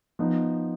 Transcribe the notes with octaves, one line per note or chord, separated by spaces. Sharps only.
F3 B3 D#4